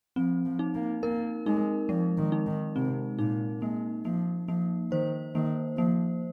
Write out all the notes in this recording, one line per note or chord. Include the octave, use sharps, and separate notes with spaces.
F3 C4
F3
D#4
A#3
A#3 A#4
G#3 D#4
F3 G#3
D#3
D#4
D#3
C3 C4
A#2 D#4
G#3 A#3
F3 A#3
F3 A#3
D#3 C5
D#3 A#3
F3 A#3